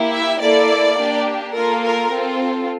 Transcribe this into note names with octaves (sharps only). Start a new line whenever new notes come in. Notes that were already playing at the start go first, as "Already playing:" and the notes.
Already playing: A#3 E4 G4
E5
A#3 E4 A4 D5
A#3 D4 G4
A#3 F4 A4 A#4
A#4
C4 F4 A4